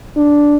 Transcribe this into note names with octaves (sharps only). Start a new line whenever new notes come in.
D4